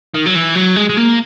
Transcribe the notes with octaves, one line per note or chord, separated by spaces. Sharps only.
D#3
F#3
E3
F#3
G#3
G#3
A#3